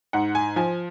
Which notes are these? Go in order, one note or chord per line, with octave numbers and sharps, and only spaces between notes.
G#2 F#5
G#5
F3 G#5